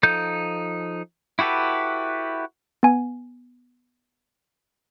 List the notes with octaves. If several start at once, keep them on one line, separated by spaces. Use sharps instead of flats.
F3 D#4 A4 G6
E4 F#4 G4 A4 B4
B3 G#5